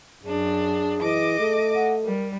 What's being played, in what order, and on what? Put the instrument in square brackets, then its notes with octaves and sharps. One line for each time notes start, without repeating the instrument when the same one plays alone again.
[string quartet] F#2 D4 [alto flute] G#4
[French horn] E3 [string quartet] D#5 D6
[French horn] A3
[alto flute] F#5
[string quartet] G3 [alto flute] A#4